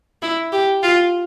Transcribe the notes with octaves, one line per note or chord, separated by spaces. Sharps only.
E4
G4
F4